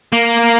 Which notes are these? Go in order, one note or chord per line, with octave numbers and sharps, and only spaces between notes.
A#3